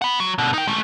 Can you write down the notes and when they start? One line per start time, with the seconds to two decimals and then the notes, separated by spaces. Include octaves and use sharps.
0.02 F#5 B5
0.20 F#3
0.38 B2 D3
0.54 D#4 G5
0.67 G#3 A3